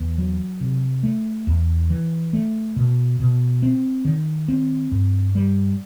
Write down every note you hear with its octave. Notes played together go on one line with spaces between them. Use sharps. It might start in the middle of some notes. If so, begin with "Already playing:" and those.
Already playing: E2
F#3
C3
A3
E2
E3
A3
B2
B2
C4
D#3
C4
G2
G3